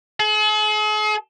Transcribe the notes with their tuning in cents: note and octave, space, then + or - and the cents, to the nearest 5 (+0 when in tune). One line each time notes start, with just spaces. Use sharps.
G#4 +45